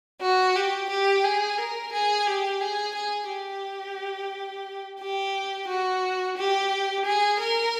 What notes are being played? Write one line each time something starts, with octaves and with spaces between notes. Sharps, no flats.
F#4
G4
G4
G#4
A#4
G#4
G4
G#4
G#4
G4
G4
F#4
G4
G#4
A#4